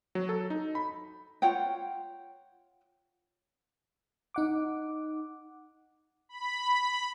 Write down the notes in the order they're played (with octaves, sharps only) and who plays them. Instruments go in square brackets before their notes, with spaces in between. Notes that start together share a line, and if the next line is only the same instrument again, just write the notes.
[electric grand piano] F#3
A4
D#4
B5
[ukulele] F4 C#5 F#5 G5
[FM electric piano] D#4 F#5 D6
[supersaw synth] B5